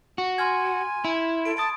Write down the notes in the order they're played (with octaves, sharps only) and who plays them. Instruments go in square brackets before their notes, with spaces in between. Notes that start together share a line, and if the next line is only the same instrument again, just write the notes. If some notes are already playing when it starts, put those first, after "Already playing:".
[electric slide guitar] F#4
[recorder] G#5 [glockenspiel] C6 F6 G#6
[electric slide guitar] E4 [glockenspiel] B5
[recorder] A4 [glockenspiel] D7
[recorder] A5 [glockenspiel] D#6 A6 D7